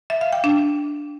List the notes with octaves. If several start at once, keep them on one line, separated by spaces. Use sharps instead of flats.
E5
F5
G5
D4